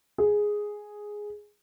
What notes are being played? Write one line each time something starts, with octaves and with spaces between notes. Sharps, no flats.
G#4